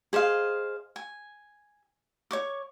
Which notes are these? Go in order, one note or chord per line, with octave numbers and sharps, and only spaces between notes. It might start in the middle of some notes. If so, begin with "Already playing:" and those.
G#4 C5 D#5 F5
G#5
C#5 C#6 D6